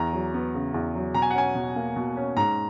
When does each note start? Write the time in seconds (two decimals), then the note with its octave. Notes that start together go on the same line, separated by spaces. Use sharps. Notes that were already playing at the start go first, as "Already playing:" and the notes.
Already playing: E2 A#5
0.13 F#3
0.34 B3
0.55 C#3
0.74 E2
0.95 F#3
1.14 B2 A#5
1.22 G#5
1.31 F#5
1.35 C#4 G#5
1.55 B2
1.76 A#3
1.96 B2
2.17 C#4
2.36 G#2 A#5